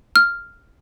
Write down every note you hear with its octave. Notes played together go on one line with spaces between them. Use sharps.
F6